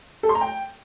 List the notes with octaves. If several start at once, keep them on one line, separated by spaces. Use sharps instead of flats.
A4
C6
A#5
G5